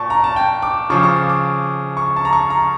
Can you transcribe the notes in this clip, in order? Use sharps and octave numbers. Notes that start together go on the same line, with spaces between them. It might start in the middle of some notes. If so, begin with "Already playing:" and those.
Already playing: A#2 A5 C#6
A#5
A5
G5
D6
C#3 F3 C#6
C#6
D6
D6
C#6
A5
A#5
C#6
A#5